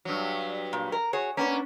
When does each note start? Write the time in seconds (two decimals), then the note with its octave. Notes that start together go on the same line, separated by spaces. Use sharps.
0.05 G2 F#3
0.73 A#2
0.92 A#4
1.13 F#4 G#4 C#5
1.37 A#3 B3 C#4 D4